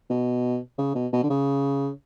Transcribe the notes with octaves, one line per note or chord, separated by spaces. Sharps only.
B2
C#3
B2
B2
D3
C#3